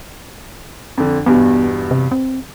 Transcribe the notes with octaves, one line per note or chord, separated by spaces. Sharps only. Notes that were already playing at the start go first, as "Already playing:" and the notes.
F2 D3
E2 G2 B2 B3
C3
C4